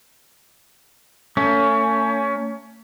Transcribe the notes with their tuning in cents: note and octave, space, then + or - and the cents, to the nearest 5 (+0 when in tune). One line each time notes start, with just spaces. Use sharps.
A3 +40 C#4 +20